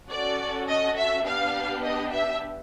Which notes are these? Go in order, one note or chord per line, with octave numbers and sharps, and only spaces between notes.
C#4 F#4 A4 D5
D#5
E5
B3 D4 G4 F5
D#5
E5